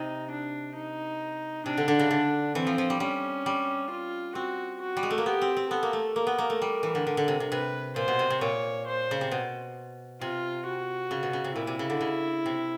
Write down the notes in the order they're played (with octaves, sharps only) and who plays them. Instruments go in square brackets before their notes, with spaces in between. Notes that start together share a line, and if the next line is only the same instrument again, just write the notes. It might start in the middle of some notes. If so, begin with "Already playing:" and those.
Already playing: [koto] C3 [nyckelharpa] D#4
[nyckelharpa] D4
D#4
[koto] C3 [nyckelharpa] D4
[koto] D3
D3
C#3
D3
[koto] E3 [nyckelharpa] C4
[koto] F3
F3
G3
[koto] G3 [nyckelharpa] C#4
[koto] G3
[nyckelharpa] F4
[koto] C4 [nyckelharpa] F#4
[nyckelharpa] F#4
[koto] G3
G#3
A3
A#3
[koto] B3 [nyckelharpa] G4
[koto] C4
C4
[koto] B3 [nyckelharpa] A4
[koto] A#3
A3
[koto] A#3 [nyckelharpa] A#4
[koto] B3
A#3
A3
G3
E3
D3
D3
D3
C3
C3
[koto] C3 [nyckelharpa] B4
[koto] A#2 [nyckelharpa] C5
[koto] B2
C3
C3
[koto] A#2 [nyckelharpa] C#5
[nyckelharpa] C5
[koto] C#3
C3
B2
[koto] C3 [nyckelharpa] F4
[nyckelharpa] F#4
[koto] C#3
B2
C#3
C3
[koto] A#2 [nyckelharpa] E4
[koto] C3
C#3
D3
C#3
C3